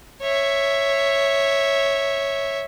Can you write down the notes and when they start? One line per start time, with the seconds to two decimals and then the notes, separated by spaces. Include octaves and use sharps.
0.22 C#5 E5